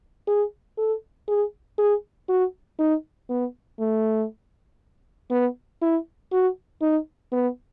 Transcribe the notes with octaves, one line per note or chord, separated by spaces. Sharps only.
G#4
A4
G#4
G#4
F#4
D#4
B3
A3
B3
E4
F#4
D#4
B3